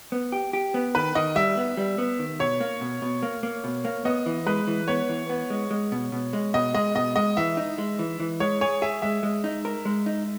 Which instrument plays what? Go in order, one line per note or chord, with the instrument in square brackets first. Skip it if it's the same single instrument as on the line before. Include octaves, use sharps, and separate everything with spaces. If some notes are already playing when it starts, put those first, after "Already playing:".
[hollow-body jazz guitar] B3
G4
G4
B3
[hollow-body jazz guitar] D#3 [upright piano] B4
[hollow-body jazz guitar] D#3 [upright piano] D#5
[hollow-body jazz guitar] G3 [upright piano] E5
[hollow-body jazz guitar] B3
G3
B3
D#3
[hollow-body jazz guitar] B2 [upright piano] C#5
[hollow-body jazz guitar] A#3
B2
B2
A#3
A#3
B2
A#3
[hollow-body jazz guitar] B3 [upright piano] D#5
[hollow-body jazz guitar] E3
[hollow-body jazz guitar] G#3 [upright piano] B4
[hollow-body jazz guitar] E3
[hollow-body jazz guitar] B3 [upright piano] C#5
[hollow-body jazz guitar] E3
B3
G#3
G#3
B2
B2
G#3
[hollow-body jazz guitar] B2 [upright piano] D#5
[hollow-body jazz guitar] G#3 [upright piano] D#5
[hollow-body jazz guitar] B2 [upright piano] D#5
[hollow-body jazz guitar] G#3 [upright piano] D#5
[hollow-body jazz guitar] E3 [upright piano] E5
[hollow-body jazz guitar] D#4
G#3
E3
E3
[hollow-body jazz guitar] G#3 [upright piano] C#5
[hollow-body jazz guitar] G#4 [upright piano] C#5
[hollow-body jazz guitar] G#4 [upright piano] E5
[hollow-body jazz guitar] G#3 [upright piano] E5
[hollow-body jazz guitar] G#3
D#4
A#4
G#3
D#4